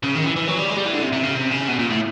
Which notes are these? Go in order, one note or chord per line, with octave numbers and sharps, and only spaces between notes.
C#3
D#3
E3
E3
F#3
G3
G#3
G3
E3
D3
C3
C3
C#3
C3
C#3
B2
A#2
A2